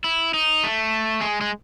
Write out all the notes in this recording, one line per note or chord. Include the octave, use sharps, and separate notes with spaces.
E4
D#4
A3
G#3
G#3